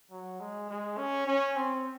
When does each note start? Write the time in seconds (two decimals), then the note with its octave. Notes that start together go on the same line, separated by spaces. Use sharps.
0.11 F#3
0.40 G#3
0.70 G#3
0.97 C#4
1.27 C#4
1.56 C4